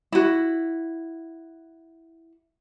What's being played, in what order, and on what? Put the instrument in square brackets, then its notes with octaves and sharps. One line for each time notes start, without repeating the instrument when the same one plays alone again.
[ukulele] E4 F#4